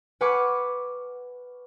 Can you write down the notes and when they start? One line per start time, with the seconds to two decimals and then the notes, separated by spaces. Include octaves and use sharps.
0.21 B4 F#5 G#5 C#6 D6 F6